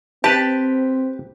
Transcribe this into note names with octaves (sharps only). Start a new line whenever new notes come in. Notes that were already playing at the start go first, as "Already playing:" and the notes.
C4 G4 B4 A5